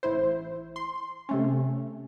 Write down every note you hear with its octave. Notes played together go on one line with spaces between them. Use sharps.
A1 E4 C5
C6
C3 A3 C#4